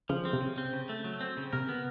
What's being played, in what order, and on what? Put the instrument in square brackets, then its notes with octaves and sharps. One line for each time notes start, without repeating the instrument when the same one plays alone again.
[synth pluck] C#3 [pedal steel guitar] F3
[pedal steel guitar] C4
[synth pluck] C3
[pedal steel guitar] C#3
C4
C#3
A3
F#3
C4
C#3
[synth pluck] C3 [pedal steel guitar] A#4
[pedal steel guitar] B3